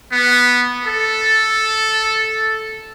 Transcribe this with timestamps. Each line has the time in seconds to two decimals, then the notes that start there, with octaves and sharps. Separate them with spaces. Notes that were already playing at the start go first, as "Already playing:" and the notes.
0.13 B3
0.86 A4